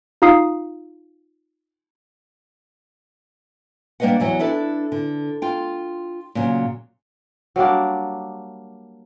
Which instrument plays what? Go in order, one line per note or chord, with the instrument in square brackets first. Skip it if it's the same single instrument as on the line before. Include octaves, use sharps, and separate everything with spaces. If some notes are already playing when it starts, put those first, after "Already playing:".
[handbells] D#4 F4 F5 A#5 D#6 C7
[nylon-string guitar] G3 A#3 D4 B4 D#5 F#5
E2 E3 F#3 F#5
D4 E4 A4 B4 D5
D3
F4 G5
A#2 C#3 F#3
[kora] F#3 G3 A#3 D4